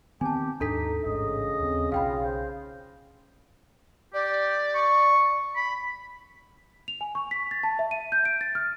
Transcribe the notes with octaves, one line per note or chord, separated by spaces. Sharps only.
D#3 B3 C4 G4 G#5 A5
D#2 G#2 D4 D#4 A4 A#5 B6
A1 G#2 C#3 D#5
D#2 C4
B1 F4 F5 G5 B5
C5
G4 D5
C#6
B5
F7
G#5
C#6
B6
A6
A5
E5
D#7
G6
D7
A6
F6